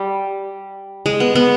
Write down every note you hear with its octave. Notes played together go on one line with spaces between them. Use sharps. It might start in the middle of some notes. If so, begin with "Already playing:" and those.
Already playing: G3
G#3
B3
B3